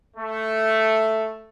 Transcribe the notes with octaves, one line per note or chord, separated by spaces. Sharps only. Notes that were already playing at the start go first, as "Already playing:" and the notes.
A3